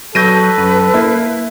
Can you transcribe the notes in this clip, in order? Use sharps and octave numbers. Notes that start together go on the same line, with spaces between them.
F#3 A4 B4 G6 A#6 D#7
F#2
A#3 E4